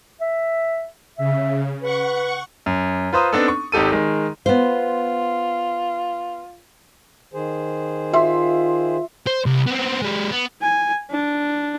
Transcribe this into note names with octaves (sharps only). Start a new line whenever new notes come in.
E5
C#3 E5
B4 F#5 C#6
F#2
F4 B4 C5 A#5 D#6
B3 C4 D4 D#4 A4
C#6
G#1 D#4 G4 A4 D#7
D#3 G#3
B3 F4 C5
D#3 G#4 C5
F4 E5 C6
C5
C2
B3 C4
G#3 G4
B3
G#5
D4